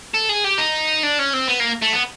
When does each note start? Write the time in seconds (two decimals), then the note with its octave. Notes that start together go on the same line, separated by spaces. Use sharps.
0.14 A4
0.29 G#4
0.44 G4
0.58 D#4
1.03 D4
1.19 C#4
1.34 C4
1.48 B3
1.60 A#3
1.82 A3
1.93 B3